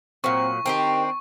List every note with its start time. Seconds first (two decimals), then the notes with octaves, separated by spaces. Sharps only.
0.24 A#2 F#3 C4 C#6
0.66 D#3 C4 D4 G4 A#4